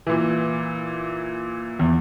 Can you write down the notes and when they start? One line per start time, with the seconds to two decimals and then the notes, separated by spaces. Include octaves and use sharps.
0.07 A#2 E3
1.79 E2